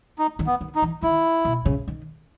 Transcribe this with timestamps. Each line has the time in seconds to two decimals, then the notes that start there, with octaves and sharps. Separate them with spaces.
0.19 D#4
0.39 D#3
0.47 B3
0.61 D#3
0.75 D#4
0.82 E3
1.03 D#3 E4
1.45 B2
1.66 C#3
1.88 D#3